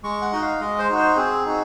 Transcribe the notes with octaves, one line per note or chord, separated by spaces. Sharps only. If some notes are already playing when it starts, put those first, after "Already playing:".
G#3 C#6
F#5
D#4 F#4 D#5
F5
G#3 D#5
C5
D#4 F#4
C5
C4 G#4
D#4 F#4